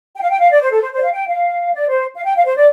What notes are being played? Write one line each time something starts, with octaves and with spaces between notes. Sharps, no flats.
G5
F5
G5
F5
D5
C5
A4
C5
C5 D5
F5
G5
F5
D5
C5
F5
G5
F5
C5
D5